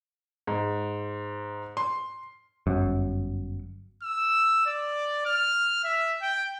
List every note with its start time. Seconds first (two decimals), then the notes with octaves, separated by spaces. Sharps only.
0.47 G#2
1.77 C6
2.67 G1 F#2
4.03 E6
4.66 D5
5.26 F6
5.84 E5
6.22 G5